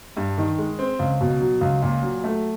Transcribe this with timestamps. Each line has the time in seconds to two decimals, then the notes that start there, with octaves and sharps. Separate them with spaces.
0.17 G2
0.38 D#3
0.58 G#3
0.79 C4
0.99 C#2
1.21 B2
1.41 F#3
1.61 C#2
1.82 A#2
2.03 F#3
2.24 A3